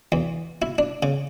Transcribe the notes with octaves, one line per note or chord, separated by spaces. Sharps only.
E2
E4
D4
C#3